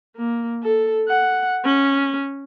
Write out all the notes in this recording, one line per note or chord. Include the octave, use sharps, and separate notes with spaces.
A#3
A4
F#5
C#4